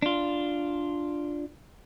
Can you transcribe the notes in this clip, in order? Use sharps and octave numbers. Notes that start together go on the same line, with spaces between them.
D4 F4